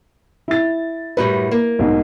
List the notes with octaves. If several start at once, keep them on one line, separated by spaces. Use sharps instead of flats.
E4 A6
F#2 A2 G3 B4
A#3
B1 G#2